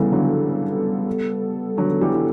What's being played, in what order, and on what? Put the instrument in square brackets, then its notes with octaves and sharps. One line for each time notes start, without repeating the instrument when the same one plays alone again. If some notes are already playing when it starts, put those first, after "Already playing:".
Already playing: [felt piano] C#3 E3 [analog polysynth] G3 B3 A4
[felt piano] D3 F#3
D3 F#3
E3 G3
E3